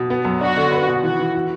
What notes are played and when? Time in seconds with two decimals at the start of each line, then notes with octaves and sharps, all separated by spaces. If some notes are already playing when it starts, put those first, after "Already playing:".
Already playing: B2
0.10 B3
0.25 F#2
0.41 D4 F#4
0.57 D3
0.72 B4
0.88 B2
1.03 E3 F#4
1.19 E3
1.35 F#4